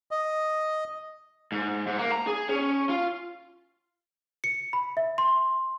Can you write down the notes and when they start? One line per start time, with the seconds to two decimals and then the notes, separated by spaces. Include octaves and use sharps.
0.11 D#5
1.52 G#2
1.87 G#2
1.98 A#3
2.12 A#5
2.27 G#4
2.49 C#4
2.90 F4
4.44 C#7
4.73 B5
4.97 E5
5.18 C6